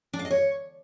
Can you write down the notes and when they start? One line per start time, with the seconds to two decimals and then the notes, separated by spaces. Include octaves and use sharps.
0.13 D4
0.19 F5
0.25 D#5
0.31 C#5